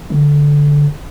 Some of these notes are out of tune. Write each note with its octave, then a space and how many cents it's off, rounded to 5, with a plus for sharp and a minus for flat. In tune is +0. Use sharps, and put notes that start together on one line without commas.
D3 -10